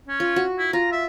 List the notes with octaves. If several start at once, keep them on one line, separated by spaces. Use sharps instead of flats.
C#4
F4
F#4
E4
F4 A#5
E5